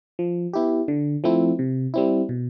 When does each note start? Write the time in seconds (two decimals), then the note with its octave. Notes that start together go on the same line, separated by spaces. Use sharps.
0.19 F3
0.53 B3 E4 G4
0.88 D3
1.24 F3 A3 C4 E4
1.59 C3
1.94 G3 C4 E4
2.29 B2